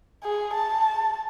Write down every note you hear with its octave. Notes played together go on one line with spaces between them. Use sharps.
G#4
A5